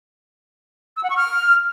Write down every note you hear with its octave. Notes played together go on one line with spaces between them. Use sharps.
E6
F#5
C#6
F6